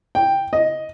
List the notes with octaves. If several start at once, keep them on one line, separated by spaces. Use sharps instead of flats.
G5
D#5